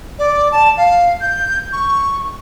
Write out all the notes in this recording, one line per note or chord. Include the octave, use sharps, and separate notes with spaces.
D5
A5
F5
G6
C#6